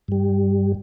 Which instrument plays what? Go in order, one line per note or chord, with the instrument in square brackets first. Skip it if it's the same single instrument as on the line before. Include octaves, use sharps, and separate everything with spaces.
[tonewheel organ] G2 G3